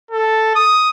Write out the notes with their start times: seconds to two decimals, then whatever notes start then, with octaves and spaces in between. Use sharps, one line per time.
0.11 A4
0.55 D#6